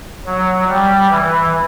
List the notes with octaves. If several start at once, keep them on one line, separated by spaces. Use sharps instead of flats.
F#3
G3
E3